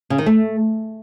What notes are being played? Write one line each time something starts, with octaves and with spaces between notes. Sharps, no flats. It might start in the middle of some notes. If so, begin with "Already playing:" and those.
C#3
D#3
A3